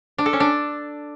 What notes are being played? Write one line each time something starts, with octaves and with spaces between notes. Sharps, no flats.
D4
A4
C#4
D4